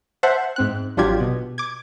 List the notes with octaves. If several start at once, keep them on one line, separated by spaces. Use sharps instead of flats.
C5 E5 F#5 A5
G#2 C4 F#6
G#1 F#3 D4 F4 G4 G#6
B2
D6 G#6